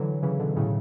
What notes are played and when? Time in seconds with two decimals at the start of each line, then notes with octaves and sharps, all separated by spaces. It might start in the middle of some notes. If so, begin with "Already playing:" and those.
Already playing: D3 E3 F#3
0.23 C#3 E3
0.39 B2 D3
0.56 A2 C#3